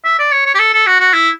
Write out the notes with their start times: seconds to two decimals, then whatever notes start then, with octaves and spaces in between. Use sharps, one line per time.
0.05 E5
0.19 D5
0.32 C#5
0.46 C#5
0.55 G4
0.59 A4
0.73 A4
0.86 F#4
1.00 F#4
1.13 E4